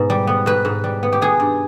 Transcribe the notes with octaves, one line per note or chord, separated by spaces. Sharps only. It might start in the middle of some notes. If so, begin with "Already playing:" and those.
Already playing: G#2 B2 B3
G3
B3
G#2 B4
G#2
G3
B3
G4
B3 G#4
G2